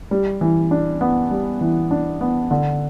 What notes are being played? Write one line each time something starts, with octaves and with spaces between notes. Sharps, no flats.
G3
E3
D4
B3
G3
E3
D4
B3
D3